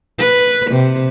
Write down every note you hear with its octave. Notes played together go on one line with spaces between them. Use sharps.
B4
C3